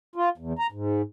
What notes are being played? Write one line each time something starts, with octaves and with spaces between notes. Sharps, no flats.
F4
E2
A#5
G#2